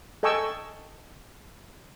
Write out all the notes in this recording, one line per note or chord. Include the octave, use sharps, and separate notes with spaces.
A4 D#5 G5 G#5 C#6 E6